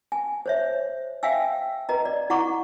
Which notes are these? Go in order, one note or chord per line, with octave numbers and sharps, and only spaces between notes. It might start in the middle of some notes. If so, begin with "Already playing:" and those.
G#5
C5 C#5 E5
E5 F5 G5 G#5 E6
B4 D#5 A#5
D5
E4 F#5 A#5 C#6 D6